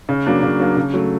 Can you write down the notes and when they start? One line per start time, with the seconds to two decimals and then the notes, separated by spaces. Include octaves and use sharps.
0.09 C#3
0.26 F#3 A#3 D4
0.43 C#3
0.60 F#3 A#3 D4
0.77 C#3
0.94 F#3 A3